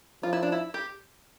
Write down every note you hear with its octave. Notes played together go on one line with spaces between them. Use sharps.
F3 F4
E4
D4
E4
G4